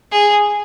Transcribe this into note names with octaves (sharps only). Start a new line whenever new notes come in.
G#4